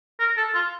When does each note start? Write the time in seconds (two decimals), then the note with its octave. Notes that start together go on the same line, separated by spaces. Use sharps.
0.20 A#4
0.37 A4
0.55 F4